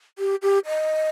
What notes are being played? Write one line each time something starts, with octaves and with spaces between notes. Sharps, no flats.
G4
G4
D#5